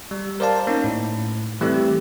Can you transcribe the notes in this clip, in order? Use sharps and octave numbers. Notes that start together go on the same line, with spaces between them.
G3
A#4 C5 D5 F5 A5
A#3 C#4 D#4
A2
E3 G3 A3 C4 G4